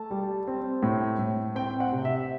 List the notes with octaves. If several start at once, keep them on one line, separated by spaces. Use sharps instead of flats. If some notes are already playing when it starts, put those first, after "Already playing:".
Already playing: A3 A5
G3
C4
A2
A2
C4 G5
F#5
C3
E5